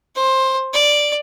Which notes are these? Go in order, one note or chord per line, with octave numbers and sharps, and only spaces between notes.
C5
D5